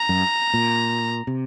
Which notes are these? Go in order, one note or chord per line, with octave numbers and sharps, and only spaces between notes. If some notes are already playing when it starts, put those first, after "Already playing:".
Already playing: A#5
F#2
A#2
C3